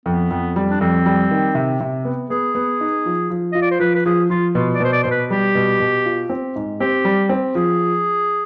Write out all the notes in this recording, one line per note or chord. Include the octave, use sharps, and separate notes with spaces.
F2 B3
F2
G3
D4
F2 C4
G3
D#3
C3
C3
B3
B3 G#4
B3
D#4
F3
F3
F4 D#5
D5
C5
F3 B4
B4
F3 G#4
F3 F4
B2 F4
D5
B2 C5
D5
B2 C5
B4
G3 G4
B2
B2
F4
C4
G#2
C4 G4
G3
C4
F3 G#4